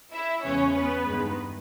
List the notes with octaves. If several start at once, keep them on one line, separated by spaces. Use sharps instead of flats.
E4 E5
E2 C#3 G#3 B3 C#4 C#5
B3 B4
G2 D#3 G#3 B3